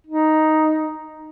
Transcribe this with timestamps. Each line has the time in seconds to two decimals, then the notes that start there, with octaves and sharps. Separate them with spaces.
0.07 D#4